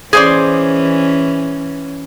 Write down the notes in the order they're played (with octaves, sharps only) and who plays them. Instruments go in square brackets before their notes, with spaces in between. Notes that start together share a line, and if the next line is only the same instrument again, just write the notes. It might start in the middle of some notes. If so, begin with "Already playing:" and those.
[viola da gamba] E3 C#4 [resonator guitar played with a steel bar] G#4 C5 D5